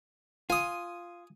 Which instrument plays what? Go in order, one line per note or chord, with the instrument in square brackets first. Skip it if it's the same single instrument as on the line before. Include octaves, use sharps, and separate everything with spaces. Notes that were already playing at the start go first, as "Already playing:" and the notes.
[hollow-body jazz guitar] F4 [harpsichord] G#5 D#6